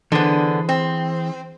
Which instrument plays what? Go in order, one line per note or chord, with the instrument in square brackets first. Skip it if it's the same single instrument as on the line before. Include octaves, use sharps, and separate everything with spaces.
[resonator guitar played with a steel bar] D3 B3 [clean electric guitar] E3 G#4 C5
[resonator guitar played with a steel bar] C4